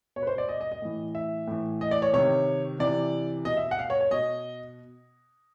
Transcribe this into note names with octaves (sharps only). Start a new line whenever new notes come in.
B2 C#5
B4
C5
D5
D#5
D#5
D#5
A2 E3
E5
A2 E3
D#5
D5
C#5
C3 D#3 C#5
C3 E3 D5
B2 D#5
E5
F#5
F5
C#5
C#5
B2 D#5